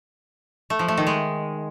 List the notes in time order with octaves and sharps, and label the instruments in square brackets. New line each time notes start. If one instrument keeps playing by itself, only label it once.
[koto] A3
F3
A3
D#3
G#3